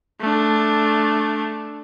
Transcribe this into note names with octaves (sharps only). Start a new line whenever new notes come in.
A3 D4